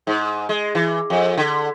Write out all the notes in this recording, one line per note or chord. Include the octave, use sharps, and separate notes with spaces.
G#2
G#3
E3
F2
D3